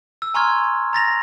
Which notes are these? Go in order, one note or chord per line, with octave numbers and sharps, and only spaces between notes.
E6
G#5 A#5 C6 C#6 F6 G#6
A#5 A6 A#6 F7